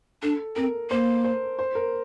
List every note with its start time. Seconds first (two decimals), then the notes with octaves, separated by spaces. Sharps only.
0.23 D4 A4
0.56 C4 A#4
0.90 A#3 C5
1.24 C5
1.59 C5
1.75 A#4